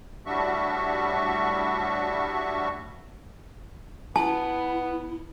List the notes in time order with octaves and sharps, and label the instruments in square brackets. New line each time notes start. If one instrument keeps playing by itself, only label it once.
[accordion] A2 G3 D4 F#4 E5 C#6
[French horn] B3 [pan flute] E4 [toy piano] A5